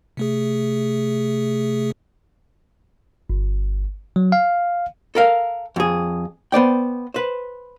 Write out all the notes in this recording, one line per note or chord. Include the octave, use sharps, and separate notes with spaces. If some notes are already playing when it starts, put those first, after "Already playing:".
C3 A3 G#4
G1
F#3
F5
A4 A#4 F5
F2 G#4
B3 C5 D5 G5
B4 C5